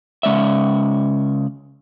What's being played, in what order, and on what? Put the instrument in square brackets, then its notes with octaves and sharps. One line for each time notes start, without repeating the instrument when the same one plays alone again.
[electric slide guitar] C#3 G#3 D5 E5